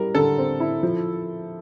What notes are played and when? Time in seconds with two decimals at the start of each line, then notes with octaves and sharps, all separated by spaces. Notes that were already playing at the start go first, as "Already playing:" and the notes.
Already playing: G3 E4 A#4
0.15 D3 A4
0.38 C4
0.60 E4
0.83 F3